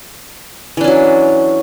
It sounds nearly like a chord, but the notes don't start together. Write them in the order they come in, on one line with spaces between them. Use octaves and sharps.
E3 D4 C#4 F#3